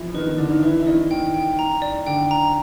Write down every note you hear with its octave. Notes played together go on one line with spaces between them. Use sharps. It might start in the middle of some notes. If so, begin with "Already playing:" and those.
Already playing: E3 F3 E4 F4
D#3 D#4 B4
D#3 D#4
D3 D4 D5
D#3 D#4
E3 E4 B4
E4
D#3 D#4 D5
D#3 D#4 G5
G5
A#5
D5
D3 D4 G5
A#5